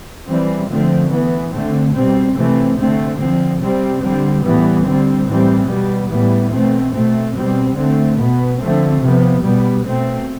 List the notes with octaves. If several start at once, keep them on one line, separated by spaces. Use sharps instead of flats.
E3 G3 C4
D3 F3 A3 C4
E3 B3
D3 A3 C4
B2 G3 C4
C3 E3 A3 C4
D3 A3 C4
D3 F3 C4
C3 G3 C4
D3 G3 C4
A2 E3 G3 B3
D3 G3 C4
A2 E3 G3 C4
B2 G3 B3
A2 E3 G3 B3
B2 A3 C4
B2 A3 C4
B2 G3 C4
D3 A3 C4
B2 B3
D3 F3 A3 C4
C3 F3 B3
B2 G3 B3
B2 A3 C4